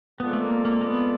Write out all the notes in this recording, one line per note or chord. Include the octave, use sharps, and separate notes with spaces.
G#3 B3 C4 F4 A4 D5
A3
A#3
A#3
A#3
B3